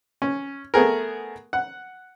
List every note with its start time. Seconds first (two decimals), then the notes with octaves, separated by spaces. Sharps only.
0.22 C#4
0.74 A3 B3 G#4 A#4
1.53 F#5